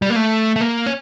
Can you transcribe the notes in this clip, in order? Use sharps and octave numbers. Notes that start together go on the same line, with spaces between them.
G3
A#3
A3
A3
A#3
C#4